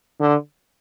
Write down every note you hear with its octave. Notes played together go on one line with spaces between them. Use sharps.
D3